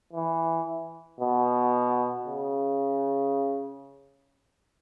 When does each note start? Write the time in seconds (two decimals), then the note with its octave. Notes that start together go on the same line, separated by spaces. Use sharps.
0.13 E3
1.20 B2
2.27 C#3